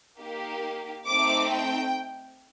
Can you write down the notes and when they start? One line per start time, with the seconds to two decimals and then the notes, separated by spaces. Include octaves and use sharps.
0.19 A#3 D#4 G4
1.07 A3 C4 D#4 D6
1.52 G5